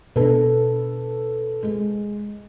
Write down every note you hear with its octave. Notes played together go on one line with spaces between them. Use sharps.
B2 D4 A4 B4
G#3